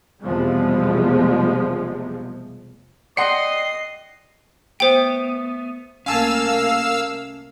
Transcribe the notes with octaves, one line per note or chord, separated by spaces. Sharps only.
F1 E2 B2 F3 G3 G#3
D5 D#5 F#5 G5 C6 C7 C#7
A3 B3 C5 G5
C2 A3 A#3 C#4 F5 G#5 A5 E6